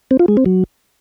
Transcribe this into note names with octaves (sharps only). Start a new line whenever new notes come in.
C4
F4
G#3
C4
F#3